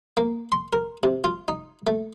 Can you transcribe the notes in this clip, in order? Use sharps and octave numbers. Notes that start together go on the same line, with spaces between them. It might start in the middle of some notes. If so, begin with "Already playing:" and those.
A#3
C6
A#4
C3
F4
D#4
A3